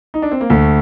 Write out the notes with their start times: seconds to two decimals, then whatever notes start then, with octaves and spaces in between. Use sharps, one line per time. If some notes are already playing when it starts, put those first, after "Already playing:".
0.14 D#4
0.22 D4
0.31 C4
0.41 A#3
0.50 D2 A3